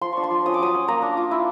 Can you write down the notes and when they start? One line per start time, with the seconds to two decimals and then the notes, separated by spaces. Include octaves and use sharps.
0.01 F3 C6
0.12 D4 C#6
0.23 C6
0.31 F3
0.46 C#4 D#6
0.54 D6
0.60 F#3 D#6
0.74 C#4
0.88 A#3 A#5
1.02 D4
1.17 F4
1.31 E4